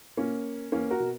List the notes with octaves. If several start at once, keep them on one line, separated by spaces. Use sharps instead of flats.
A#2 A#3 C#4
E2 A#3 C#4
F#4 A#4
B2